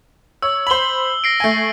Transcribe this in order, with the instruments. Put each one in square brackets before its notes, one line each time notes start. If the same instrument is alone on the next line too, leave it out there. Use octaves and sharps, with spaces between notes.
[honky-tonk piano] C#5 [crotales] E6
[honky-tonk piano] C5 B5 [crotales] F#7 G7
[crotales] A#6 C7 D7
[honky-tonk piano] A3 G#5